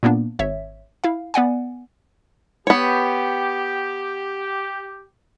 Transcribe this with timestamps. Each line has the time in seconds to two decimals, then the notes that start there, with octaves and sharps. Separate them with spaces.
0.03 A#2 A#3 B3 D4
0.39 G#1 C#5 E5
1.04 E4 F5
1.34 B3 D5 F#5 G#5
2.67 B3 G4 C#5